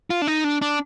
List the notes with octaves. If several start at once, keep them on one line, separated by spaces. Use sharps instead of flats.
F4
D4
D#4
D4
D4